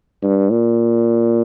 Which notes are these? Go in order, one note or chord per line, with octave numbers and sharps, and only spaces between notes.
G2
A#2